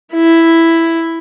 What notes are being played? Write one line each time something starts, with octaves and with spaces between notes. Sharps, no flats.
E4